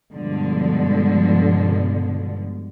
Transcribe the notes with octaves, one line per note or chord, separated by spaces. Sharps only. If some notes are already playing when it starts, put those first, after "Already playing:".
G2 B2 D3 F3 G#3